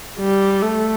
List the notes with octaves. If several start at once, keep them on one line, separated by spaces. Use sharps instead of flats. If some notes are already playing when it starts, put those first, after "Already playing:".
G3
A3